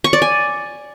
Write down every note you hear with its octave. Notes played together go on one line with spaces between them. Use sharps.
C#6
D5
G#5